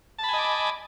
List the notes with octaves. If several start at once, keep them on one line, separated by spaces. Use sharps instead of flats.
D#5 G#5 A5 B5 D6